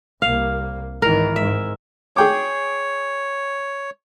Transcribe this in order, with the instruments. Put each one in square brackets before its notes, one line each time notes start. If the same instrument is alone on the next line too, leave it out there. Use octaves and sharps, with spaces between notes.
[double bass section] C2 A#3 [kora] F5
[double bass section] G#1 D#3 E3 [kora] A#4
[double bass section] G#2 [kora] E5
[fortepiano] G#4 G5 D6 [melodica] C#5